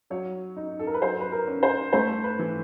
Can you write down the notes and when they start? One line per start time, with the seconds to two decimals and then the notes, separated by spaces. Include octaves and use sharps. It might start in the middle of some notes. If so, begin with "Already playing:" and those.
0.10 F#3 C#5
0.57 D#4
0.79 A4
0.87 A#4
0.94 B4
1.02 F#3 C5
1.21 B4
1.32 A#4
1.48 C#4
1.63 C5
1.93 A3 C5
2.24 B4
2.39 E3